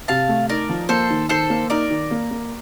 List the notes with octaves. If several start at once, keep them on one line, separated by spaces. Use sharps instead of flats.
C3 F5 A5
A3
D#4 A#4 D5
F3
A#3 A4 C5
D#3
D#3 A4 C5
A#3
D#4 A#4 D5
D#3
A#3
A#3